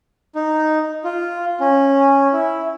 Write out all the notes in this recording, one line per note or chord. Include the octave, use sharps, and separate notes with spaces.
D#4
F4
C#4
E4